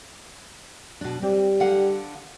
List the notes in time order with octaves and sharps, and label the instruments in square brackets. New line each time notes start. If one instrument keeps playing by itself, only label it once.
[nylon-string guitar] B2 D4
[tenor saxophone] G3 [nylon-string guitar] C4
[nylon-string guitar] D3 F5 F#5